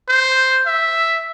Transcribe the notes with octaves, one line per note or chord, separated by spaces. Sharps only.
C5
E5